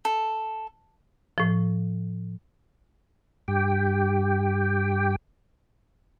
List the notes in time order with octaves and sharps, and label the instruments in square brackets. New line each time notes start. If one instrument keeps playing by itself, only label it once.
[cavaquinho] A4
[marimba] A2 F3
[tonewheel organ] G2 G4 G5